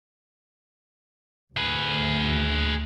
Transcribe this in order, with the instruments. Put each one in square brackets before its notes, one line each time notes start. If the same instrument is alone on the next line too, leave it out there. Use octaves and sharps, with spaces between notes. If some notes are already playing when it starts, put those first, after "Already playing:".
[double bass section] D2 [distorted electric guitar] G#4 B4